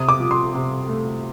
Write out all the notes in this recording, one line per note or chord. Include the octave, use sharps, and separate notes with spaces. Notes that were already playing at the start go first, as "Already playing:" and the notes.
Already playing: C3 D#6
D6
F3
C6
C3
A3